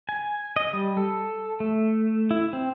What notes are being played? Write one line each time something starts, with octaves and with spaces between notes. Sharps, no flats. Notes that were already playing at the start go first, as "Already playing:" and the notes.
G#5
D#5
G3
A4
A3
E4
C4